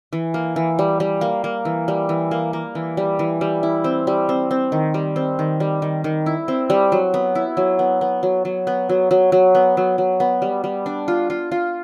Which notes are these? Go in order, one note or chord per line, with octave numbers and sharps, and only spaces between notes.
E3
A#3
E3
G3
G3
A#3
A#3
E3
G3
E3
A#3
A#3
E3
G3
E3
G3
E4
C4
G3
C4
C4
D#3
G3
C4
D#3
G3
D#3
D#3
E4
C4
G3
F#3
B3
E4
F#3
B3
B3
F#3
F#3
B3
F#3
F#3
F#3
B3
F#3
F#3
B3
G3
G3
D4
F4
F4
F4